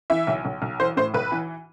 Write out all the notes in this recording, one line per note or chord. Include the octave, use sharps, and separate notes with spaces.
E3 E5
B1
B1
B1
E3 C5
A2 C5
B1 B4
E3